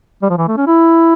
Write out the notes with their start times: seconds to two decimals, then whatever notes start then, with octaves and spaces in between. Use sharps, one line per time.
0.22 G3
0.29 F3
0.37 E3
0.48 A3
0.57 C#4
0.67 E4